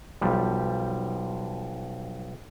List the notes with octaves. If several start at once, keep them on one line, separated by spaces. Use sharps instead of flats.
B1 F3 G3